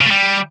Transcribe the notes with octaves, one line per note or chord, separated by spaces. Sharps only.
C#3
A3
G3